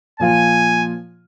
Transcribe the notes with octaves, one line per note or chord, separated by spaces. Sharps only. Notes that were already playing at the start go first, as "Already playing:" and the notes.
A#2 F3 F4 G#5